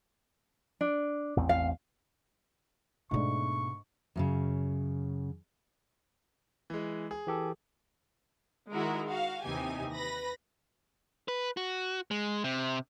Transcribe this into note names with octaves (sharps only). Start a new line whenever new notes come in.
D4
A1 E2 C4
F5
G#2 B2 A3 B3 D4 C#6
F#2 A2 C#3
E3 G#3
G#4
E3 G4 A4
D#3 G#3 E4 F#4 A#4
F#4 F5
D#2 C3 E3 D#4 G4 G#5
B4 B5 A#6
B4
F#4
G#3
C3